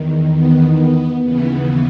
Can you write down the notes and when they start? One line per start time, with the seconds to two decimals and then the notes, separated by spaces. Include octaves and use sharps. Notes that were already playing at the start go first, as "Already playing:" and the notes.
Already playing: E2 D#3
0.33 B3
0.78 B3
1.22 D#2 C#3 E3 B3